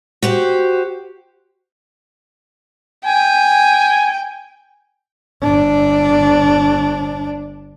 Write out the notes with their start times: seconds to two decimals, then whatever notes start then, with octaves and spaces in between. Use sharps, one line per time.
0.22 F#4 G4 C5
3.05 G5 G#5
5.42 G1 D4